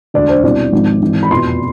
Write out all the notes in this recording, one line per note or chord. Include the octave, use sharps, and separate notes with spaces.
E1 D2 D3 D5
C5
C2 B2 D5
G#1 G#2 F3
G#1 G#2 E3
B5
F1 E2 B2 C6